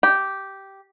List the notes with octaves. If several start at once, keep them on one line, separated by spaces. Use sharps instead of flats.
G4